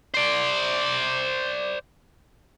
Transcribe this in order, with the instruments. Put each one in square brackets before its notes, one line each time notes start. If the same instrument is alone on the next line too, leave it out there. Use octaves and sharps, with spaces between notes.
[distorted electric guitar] C5 D5